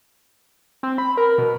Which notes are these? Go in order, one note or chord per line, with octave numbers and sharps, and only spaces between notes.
C4
B5
A#4
B2